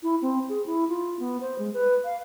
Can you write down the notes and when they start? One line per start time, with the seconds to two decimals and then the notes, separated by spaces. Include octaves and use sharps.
0.03 E4
0.22 C4
0.49 G#4
0.66 E4
0.89 F4
1.19 B3
1.41 C5
1.59 G#3
1.73 B4
2.05 F5